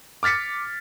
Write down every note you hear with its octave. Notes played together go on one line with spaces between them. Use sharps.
D6 F6 A6 B6 C#7